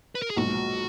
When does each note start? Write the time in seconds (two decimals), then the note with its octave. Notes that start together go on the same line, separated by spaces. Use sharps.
0.15 B4
0.22 A#4
0.30 G#4
0.37 B1 A#2 F3 G#3 F#4